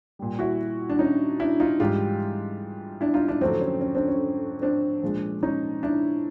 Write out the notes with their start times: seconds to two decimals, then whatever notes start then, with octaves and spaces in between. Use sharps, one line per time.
0.19 A#2 G3
0.39 E4 F#4
0.89 D4
0.99 C#4 D#4
1.40 D4 E4
1.60 D#4 F4
1.80 G#2 E3 G3 F4 G4
3.01 D4 E4
3.14 D#4 F4
3.28 D4 E4
3.41 F2 D3 F#3 A3 C4 D4
3.61 C#4
3.81 C#4
3.95 C4 D4
4.08 C#4
4.62 C4 D4
5.03 A#2 F3 G#3
5.43 C#4 D#4
5.83 D4 E4